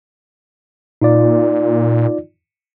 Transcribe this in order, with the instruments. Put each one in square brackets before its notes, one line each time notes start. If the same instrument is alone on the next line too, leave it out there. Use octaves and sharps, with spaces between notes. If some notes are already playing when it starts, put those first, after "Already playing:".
[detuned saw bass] A#2 [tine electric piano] D#4 F4 D5